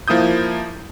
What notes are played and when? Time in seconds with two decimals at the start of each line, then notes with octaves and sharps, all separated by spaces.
0.08 F3 A#3 E4 D#6 G6